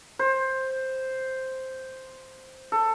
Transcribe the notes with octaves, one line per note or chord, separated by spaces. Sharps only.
C5
A4